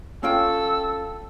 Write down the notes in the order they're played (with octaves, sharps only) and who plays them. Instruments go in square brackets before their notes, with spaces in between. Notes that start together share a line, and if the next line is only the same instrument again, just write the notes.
[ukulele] C#4 F4 G5 [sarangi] A4 [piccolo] E6